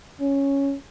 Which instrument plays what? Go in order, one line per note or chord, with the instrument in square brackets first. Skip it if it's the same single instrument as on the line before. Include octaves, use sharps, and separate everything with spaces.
[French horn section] C#4